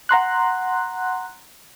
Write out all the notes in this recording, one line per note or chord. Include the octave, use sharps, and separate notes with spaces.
F#5 A#5 C6 F#6